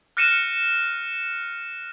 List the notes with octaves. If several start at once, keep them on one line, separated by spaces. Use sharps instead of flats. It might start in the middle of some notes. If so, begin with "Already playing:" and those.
F6 F#6 A#6 C#7 D#7 E7